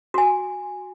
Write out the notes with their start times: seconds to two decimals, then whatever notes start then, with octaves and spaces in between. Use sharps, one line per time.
0.14 F#4 G#5